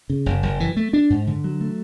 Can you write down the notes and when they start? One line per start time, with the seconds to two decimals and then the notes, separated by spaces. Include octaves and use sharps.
0.10 C#3
0.26 F#1
0.43 F#1
0.60 E3
0.77 A3
0.93 D4
1.10 G#2
1.27 D3
1.44 F#3
1.61 A3